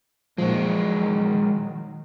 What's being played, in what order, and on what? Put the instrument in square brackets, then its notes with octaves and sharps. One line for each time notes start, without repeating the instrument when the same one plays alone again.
[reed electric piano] A#2 F3 [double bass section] D#3 F#3 [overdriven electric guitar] G#3 F#4